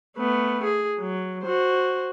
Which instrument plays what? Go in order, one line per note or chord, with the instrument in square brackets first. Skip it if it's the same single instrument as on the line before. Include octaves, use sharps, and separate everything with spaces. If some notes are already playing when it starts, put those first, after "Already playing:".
[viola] A3 B3
G#4
F#3
F#4 C5